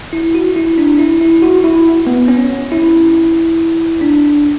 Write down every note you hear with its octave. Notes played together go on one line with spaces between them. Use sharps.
E4
F#4
E4
D4
E4
E4
F#4
E4
B3
C#4
E4
D4